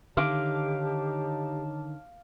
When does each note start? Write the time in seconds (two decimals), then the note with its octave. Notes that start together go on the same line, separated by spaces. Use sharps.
0.17 D3 D#3 D#4 G4 C#5 F5 A5 D6